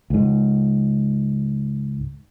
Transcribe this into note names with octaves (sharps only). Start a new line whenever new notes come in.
C#2 G#2